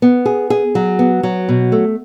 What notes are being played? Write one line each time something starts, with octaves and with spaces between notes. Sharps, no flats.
B3
G#4
G#4
F#3
B3
F#3
B2
A3